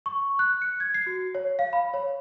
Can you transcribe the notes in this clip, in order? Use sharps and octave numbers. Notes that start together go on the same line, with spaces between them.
C#6
F#6
C#7
G#6
C7
F#4
C#5
F5
B5
C#5